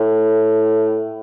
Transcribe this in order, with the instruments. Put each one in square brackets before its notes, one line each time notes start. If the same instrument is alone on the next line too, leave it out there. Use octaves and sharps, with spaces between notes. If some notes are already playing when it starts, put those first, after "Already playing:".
Already playing: [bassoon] A2